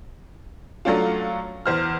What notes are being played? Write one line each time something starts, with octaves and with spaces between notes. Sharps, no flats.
F#3 A3 C#4 D4 F4
E2 C5 F6